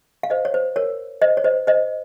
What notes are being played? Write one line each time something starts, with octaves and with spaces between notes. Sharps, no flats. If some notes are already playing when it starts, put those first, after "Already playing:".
F5
C5 D#5
C#5
C5
A#4 C#5
C5 D#5
C#5
C5 D#5
C5 D#5